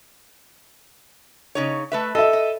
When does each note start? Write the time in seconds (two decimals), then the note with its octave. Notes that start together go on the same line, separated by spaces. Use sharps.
1.55 C#3 D#4 C#5
1.92 A3 B4 E5
2.15 A4 D#5 E5
2.33 D#5